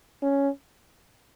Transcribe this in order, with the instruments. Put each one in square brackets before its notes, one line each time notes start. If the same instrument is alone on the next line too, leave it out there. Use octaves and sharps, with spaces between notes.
[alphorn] C#4